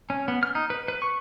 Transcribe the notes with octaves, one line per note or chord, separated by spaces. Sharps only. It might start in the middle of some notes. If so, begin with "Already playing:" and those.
C#4
B3
F6
D#4
B4
B4
C#6